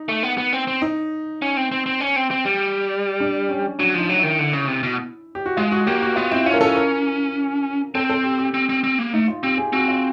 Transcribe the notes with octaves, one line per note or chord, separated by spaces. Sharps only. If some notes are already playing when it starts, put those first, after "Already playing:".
Already playing: D#4
A3
B3
B3
C4
C4
D#4
C#4
C4
C4
C4
C#4
C4
C4
G3
D4
C#4
F#3 D4
F3 D#4
F#3
E4
D#3
D3
C#3
C3
B2
G4
F#4
G#3 F4
F#4
A#3 G4
F#4
B3 F4
C4 E4
C#4 F4
A#4
C#4 A4
A#4
C4 A4
A4
G4
G4
C4
C4
C4
A#3
A3 D#4
F4
C4 G4
G#4
C4 F#4
F4